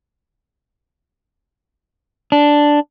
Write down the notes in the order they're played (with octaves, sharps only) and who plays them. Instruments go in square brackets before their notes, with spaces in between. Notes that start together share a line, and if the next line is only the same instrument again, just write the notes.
[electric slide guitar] D4